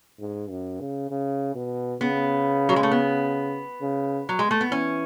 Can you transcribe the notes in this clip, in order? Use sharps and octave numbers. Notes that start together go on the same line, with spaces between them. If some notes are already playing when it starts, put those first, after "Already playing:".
G#2
F#2
C#3
C#3
B2
C#3 B3
F#3
G#3
A3
B3
C#3
F#3
G#3
A3
B3
E3 C#4